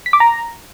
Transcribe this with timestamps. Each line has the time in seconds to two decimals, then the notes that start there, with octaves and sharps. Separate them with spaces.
0.06 B6
0.13 D6
0.20 A#5